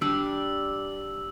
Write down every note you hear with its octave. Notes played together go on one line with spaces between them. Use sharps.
G3 D4 G4 E6